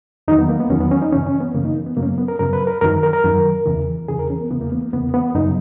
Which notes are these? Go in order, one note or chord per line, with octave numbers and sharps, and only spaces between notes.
E2 D#3 F#3 D#4
B3
A#3
B3
E2 D#3 F#3 C#4
B3
C#4
D#4
F#2 C#3 E3 C#4
C#4
B3
F#2 C#3 E3 A#3
D#4
B3
F#2 C#3 F#3 A#3
C#4
B3
B3
A#4
F#2 C#3 F#3 A#4
B4
A#4
F#2 D#3 F#3 A#4
A#4
A#4
F#2 D#3 F#3
E2 C#3 E3
E2 C#3 E3 G#4
A#4
C#4
B3
E2 C#3 E3 B3
A#3
B3
A#3
E2 C#3 E3 B3
B3
F#2 C#3 F#3 D#4